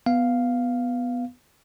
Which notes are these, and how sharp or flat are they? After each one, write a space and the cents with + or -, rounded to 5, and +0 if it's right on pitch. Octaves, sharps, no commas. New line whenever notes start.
B3 +0 F5 +0